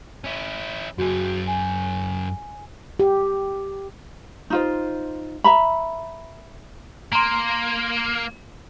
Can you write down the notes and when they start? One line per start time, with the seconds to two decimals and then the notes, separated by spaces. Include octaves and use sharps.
0.24 C#4 E4
0.98 F#2 F#4 G#4
1.47 G#5
2.99 G4
4.50 D#4 F4 C5
5.44 E5 A#5 B5
7.13 A#3 A#5 C6